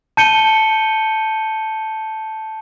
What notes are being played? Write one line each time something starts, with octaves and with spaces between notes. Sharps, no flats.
A5 G6 C#7 D#7 G7